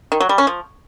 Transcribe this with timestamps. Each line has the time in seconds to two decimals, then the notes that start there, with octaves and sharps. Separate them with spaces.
0.12 D#3
0.20 F#3
0.29 G3
0.38 C#4
0.47 F3